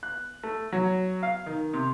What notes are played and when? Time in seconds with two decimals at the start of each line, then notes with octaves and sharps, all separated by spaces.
0.03 F#6
0.43 A3
0.72 F#3
1.23 F5
1.46 D#3
1.73 C3